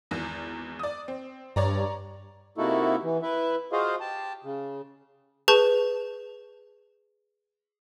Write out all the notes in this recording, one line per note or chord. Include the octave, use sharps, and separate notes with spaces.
G#1 E2
D5 D#6
C4
G2 C#5 D5 A#5
C3 A#3 D#4 E4 F#4 A4
E3
E4 B4 E5
F4 F#4 G#4 C5 D#5 F5
G4 A5
C#3
G#4 B4 A5 C#6 G6